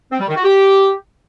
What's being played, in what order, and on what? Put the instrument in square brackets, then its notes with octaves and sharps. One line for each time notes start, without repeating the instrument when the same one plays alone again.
[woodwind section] C4
G3
D#3
F#4
G4